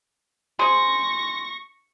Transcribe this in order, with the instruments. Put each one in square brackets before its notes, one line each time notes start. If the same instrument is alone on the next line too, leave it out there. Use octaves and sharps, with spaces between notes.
[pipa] G#4 C5 [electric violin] C#6 A#6